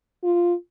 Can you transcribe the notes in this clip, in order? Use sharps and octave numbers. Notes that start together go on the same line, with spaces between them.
F4